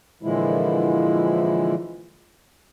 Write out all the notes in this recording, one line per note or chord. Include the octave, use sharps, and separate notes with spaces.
A#2 D3 E3 F3 G#3 E4